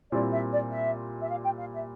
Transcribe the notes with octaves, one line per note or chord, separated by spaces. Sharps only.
A#2 G3 C4 E4 D5
E5
D5
E5
E5
F5
G5
F5
E5